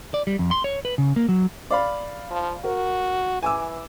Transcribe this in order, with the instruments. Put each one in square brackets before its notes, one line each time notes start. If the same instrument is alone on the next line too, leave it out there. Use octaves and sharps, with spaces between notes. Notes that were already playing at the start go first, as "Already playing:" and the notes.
[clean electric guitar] D5
G3
F2
C6
C#5
B4
C#3
A#3
F#3
[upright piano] D5 F5 B5
[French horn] F3
[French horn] F#4 [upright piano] A#4
[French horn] E3 [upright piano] G#5 D6 E6